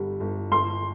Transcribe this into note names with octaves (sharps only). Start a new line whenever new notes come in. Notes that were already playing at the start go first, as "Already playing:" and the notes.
Already playing: G1 D3 G3
G1
G1 C6